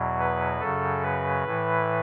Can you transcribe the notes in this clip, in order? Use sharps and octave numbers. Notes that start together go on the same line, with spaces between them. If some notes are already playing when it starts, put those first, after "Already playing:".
Already playing: E2 B2 F#3
B4
F#2 C#3 F#3 A4
B4
A2 E3